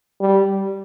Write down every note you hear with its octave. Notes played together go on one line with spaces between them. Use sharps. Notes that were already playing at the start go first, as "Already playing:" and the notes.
G3